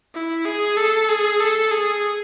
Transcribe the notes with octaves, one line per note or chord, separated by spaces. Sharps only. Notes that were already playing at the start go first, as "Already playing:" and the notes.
E4
G#4
A4
G#4
A4
G#4